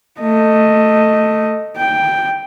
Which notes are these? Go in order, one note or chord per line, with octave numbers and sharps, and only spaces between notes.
A3 D#5
G5